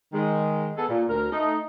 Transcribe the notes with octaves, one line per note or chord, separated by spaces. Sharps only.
D#3 G#3
B3 G#4 A4
A#2
D2 A#4
A3 D#4